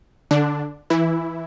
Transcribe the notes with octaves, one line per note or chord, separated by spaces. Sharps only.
D3 D4
E3 E4